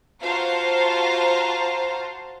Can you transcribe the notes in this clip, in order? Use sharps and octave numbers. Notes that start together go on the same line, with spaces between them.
F4 F#4 C5 F5 A5 A#5